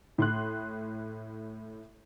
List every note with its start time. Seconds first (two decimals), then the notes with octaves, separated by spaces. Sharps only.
0.18 A2 C6 F#6